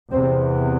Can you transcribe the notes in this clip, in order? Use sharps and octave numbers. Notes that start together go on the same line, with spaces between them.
E2 C3 C4